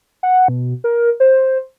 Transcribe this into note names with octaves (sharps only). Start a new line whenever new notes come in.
F#5
B2
A#4
C5